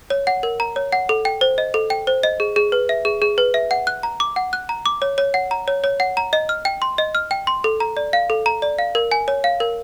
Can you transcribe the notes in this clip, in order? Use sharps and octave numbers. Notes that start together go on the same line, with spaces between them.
C#5
F#5
A#4
A#5
C#5
F#5
A4
G5
C5
D#5
A4
G5
C5
D#5
G#4
G#4
B4
E5
G#4
G#4
B4
E5
F#5
F#6
A#5
D6
F#5
F#6
A#5
D6
C#5
C#5
F#5
A#5
C#5
C#5
F#5
A#5
D#5
F6
G5
C6
D#5
F6
G5
C6
A4
A#5
D5
F5
A4
A#5
D5
F5
A#4
G#5
C#5
F5
A#4